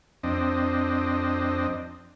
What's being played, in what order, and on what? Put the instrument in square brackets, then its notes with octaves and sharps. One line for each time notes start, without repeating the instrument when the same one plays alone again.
[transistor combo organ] F2 C4 D4 D#5